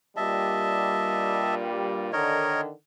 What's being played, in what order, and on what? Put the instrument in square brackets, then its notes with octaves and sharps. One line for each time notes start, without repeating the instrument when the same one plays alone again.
[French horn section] G2 A#2 G3 [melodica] D#5 E5 A5
[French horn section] D3 D#3 [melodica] A#4 C#5 D#5